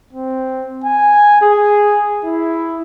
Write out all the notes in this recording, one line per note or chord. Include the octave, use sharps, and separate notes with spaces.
C4
G#5
G#4
E4